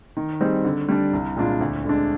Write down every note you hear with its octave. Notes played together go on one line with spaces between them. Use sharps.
D#3
G3 C4 D#4 G#4
D3
G3 D4
C2
A#2 G#3 D4 F4
D2
D3 G#3 D4